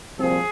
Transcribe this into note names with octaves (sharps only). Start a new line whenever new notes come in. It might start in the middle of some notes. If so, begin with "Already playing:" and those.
C2 A#2 F3 C4 G#4